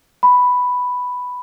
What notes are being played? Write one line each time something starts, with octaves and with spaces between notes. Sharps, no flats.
B5